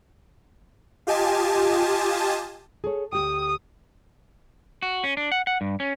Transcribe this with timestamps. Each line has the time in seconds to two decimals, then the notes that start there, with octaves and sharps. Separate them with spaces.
1.07 F4 G4 D#5 G#5 A5
2.84 G#4 A4 C#5
3.13 D2 G4 G5 D#6
4.82 F#4
5.04 C#4
5.17 D4
5.32 F#5
5.47 F#5
5.61 G2
5.80 C#4